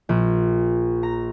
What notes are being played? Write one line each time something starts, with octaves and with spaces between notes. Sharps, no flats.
A#1
A#5